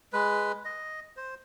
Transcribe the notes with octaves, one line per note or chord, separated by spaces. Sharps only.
G#3 B4
D#5
C5